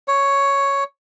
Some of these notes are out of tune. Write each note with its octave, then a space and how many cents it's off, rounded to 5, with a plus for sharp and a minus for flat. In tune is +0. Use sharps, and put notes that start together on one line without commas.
C#5 +5